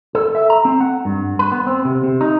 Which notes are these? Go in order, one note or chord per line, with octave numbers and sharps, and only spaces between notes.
A4
E5
A#5
C4
F#5
G2
B4
B3
C4
C3
C3
D#4